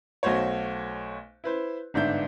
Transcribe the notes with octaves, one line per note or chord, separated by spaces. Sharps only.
B1 A3 F#4 C5 C#5
E4 B4 C5
G1 G#2 D4 E5 G6